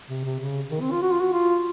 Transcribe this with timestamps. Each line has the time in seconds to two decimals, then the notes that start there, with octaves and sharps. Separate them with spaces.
0.09 C3
0.24 C3
0.40 C#3
0.71 D#3
0.81 C4
0.92 F4
1.02 F#4
1.12 F4
1.21 F#4
1.34 F4